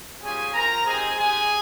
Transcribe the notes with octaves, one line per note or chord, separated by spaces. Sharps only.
G3 C#4 F4 G#4 G#5
C4 F4 A#4 A#5
C4 D#4 G4 G#4 G#5
G#3 D#4 G4 G#4 G#5